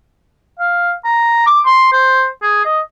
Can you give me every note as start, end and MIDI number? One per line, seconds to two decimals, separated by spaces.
0.59 0.92 77
1.05 1.42 82
1.47 1.60 86
1.66 1.89 84
1.93 2.27 72
2.42 2.65 68
2.65 2.79 75